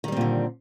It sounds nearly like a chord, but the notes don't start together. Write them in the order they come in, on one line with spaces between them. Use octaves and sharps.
D#3 G3 C4 A#2 D3